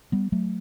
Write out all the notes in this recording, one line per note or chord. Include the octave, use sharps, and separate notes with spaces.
G3 B3
F#3 A3